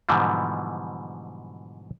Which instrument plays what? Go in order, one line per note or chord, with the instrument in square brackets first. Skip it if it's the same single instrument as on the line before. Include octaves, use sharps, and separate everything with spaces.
[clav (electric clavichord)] G#2 B2 D3 E3 F3 G3